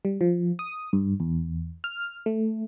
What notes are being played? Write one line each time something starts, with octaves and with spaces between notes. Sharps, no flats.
G3
F3
D#6
G2
E2
F6
A3